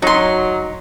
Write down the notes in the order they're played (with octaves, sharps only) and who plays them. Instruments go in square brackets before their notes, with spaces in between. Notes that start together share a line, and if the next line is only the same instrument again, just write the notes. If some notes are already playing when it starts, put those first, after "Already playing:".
[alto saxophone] F#3 [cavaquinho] D#4 C6